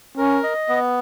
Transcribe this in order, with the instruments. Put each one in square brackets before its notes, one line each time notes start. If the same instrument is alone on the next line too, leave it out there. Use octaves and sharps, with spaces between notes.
[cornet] C#4 [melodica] A#4
[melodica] D#5
B3